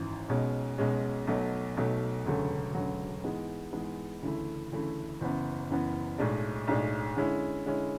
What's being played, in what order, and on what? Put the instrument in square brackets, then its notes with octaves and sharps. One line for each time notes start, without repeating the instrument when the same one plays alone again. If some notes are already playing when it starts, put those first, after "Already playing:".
Already playing: [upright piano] G#1 F#2 E3
B1 B2 G#3 C#4
B1 B2 G#3 C#4
B1 B2 F#3 A3
B1 B2 F#3 A3
E1 D2 C#3 F#3 A3
E1 D2 C#3 F#3 A3
G#2 E3 G#3 B3
G#2 E3 G#3 B3
D2 C#3 E3 A3 E4
D2 C#3 E3 A3 E4
F#1 F#2 E3 B3
F#1 F#2 E3 B3
B1 A2 G#3 D4
B1 A2 G#3 D4
D3 G#3 C#4 E4
D3 G#3 C#4 E4